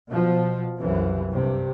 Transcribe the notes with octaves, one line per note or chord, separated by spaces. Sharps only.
B2 F3
C2 F#2 C3 E3
G2 C3